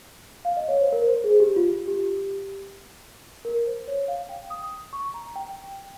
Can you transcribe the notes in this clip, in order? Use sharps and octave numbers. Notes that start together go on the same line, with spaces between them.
F5
D#5
C#5
C5
A#4
C5
G#4
G4
F4
G4
A#4
C5
C#5
F5
G5
D#6
C#6
A#5
G5